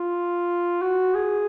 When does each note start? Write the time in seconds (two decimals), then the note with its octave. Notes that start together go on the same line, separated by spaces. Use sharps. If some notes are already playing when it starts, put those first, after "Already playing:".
Already playing: F4
0.81 F#4
1.14 G#4